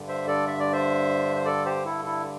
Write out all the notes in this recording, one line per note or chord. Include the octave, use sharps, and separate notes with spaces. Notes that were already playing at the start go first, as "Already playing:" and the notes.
Already playing: G2 D3
C5 E5
A4 D5
E5
D5
C5 E5
C5
A4 D5
G4 C5
E4 A4
E4 A4